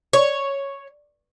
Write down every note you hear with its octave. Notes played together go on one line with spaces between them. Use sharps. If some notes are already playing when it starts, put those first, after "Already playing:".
C#5